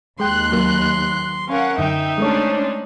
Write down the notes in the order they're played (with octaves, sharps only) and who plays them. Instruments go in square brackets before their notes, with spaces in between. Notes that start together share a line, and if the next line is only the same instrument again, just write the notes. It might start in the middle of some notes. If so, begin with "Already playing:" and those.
[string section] D#2 F#6 [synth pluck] G#3 G5 [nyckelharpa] C6
[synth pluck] F#3 A#3
[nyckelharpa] C#4 A#4 [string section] F5 F#5
[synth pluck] F#2 D3 [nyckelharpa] D#4 [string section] E5 G5
[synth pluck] G#3 A3 C#5 [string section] C#4 D4 C5